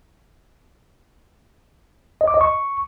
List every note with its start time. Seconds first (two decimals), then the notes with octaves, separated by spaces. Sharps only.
2.21 D#5
2.28 D6
2.34 D#5
2.41 C#6